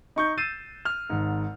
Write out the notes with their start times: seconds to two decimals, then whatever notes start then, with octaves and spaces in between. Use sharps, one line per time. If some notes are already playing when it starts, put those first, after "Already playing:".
0.16 D#4 C#6 G6
0.37 E6 G6 A6 C7 D#7 E7
0.85 F6
1.10 G#1 G#2